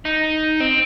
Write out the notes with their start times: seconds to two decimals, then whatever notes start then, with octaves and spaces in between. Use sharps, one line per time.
0.05 D#4
0.60 C4